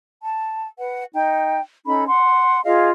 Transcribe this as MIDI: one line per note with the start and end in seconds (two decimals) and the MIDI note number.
0.23 0.67 81
0.78 1.04 71
0.78 1.04 78
1.14 1.61 63
1.14 1.61 79
1.85 2.05 61
1.85 2.05 63
1.85 2.05 69
1.85 2.05 83
2.07 2.60 78
2.07 2.60 84
2.65 2.90 65
2.65 2.90 68
2.65 2.90 75
2.65 2.90 77